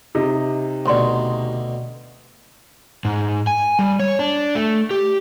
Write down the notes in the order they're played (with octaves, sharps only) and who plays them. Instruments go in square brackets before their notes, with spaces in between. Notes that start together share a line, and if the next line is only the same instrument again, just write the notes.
[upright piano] C3 D#4
[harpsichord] D2 B2 [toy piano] D5 C6 C#6
[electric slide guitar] G#2
G#5
G3
C#5
D4
A3
G4